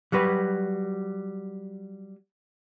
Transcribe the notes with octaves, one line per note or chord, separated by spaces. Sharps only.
F#3 G3 F#4 B4